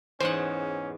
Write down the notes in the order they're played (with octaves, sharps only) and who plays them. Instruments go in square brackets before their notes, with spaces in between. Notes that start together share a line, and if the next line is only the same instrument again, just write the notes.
[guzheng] E2 G#2 F#5 [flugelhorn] C#4 [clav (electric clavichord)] C5